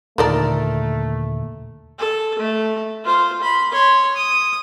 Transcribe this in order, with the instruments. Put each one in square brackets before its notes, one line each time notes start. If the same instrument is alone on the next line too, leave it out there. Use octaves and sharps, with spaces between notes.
[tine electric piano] D#2 A#2 D3 [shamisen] D#3 A4 D5 [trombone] A3 [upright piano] A#4
[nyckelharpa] A4
A3
F4 C5
B5 C6
C#5 C6
D#6